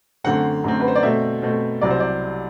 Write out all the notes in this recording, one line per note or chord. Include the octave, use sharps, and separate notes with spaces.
F#2 D3 A3 C4 F#5
F#2 D3 A3 C4
B4
C5
D5
B2 A3 C4 E5
B2 A3 C4
C2 C3 F#3 C4 D5
C5
D5